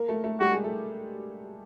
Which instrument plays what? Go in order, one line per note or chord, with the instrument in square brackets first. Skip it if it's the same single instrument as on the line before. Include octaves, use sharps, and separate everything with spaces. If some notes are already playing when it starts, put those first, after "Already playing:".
Already playing: [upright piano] A#3 A#4
A3 A4
A3 A4
[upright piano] G3 G4 [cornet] F#4
[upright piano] G#3 G#4
A3 A4